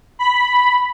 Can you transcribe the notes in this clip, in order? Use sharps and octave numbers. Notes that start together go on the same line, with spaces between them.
B5